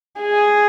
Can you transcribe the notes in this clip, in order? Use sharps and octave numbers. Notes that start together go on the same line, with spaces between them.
G#4